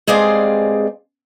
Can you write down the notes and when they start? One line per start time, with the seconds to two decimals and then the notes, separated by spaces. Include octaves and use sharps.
0.07 G2 G#3 C4 G#4 D5 F5